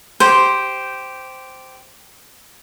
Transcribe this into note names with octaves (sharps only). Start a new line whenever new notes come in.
G4 C5